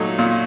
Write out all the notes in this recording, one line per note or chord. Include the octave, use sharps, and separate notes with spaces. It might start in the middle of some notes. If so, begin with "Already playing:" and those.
Already playing: A#2 F#3 A3 D#4
A#2